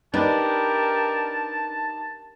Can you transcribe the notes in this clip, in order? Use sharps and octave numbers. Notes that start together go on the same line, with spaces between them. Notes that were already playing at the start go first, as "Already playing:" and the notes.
D4 D#4 G4 A#4 B4 D5 A5